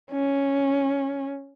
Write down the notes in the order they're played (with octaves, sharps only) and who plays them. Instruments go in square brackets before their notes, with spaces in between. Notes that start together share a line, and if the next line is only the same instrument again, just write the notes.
[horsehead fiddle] C#4